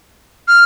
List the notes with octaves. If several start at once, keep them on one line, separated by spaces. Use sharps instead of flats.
F6